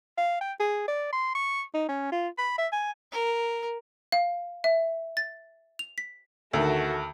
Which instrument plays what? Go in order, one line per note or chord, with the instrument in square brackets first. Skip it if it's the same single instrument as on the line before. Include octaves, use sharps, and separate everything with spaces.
[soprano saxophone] F5
G5
G#4
D5
C6
C#6
D#4
C#4
F4
B5
E5
G#5
[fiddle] A#4
[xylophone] F5
E5
A6
F7
B6
[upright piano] D2 D#3 [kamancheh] A3 F#4